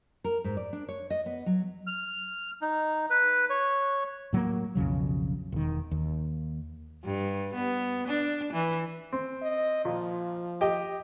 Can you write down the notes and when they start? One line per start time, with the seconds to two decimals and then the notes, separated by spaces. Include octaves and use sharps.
0.24 A#4
0.44 G#2
0.57 D5
0.73 D4
0.88 C#5
1.10 D#5
1.26 B3
1.46 F#3
1.87 F6
2.62 D#4
3.10 B4
3.50 C#5
4.33 A2 F#3 G3 A#3
4.75 B1 F2 C#3 F#3
5.52 E1 D#3
5.91 D#2
7.04 G2
7.54 B3
8.07 D4
8.53 E3
9.12 C4
9.42 D#5
9.85 A#2 F3
10.61 G4 D#5 G5